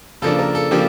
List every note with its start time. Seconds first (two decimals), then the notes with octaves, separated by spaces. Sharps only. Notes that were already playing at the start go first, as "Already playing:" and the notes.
0.22 C#3 F3 A#3 D4 A4
0.39 A#4
0.55 A4
0.71 C#3 F3 A#3 D4 G4